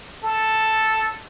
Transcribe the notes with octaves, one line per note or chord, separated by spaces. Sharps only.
A4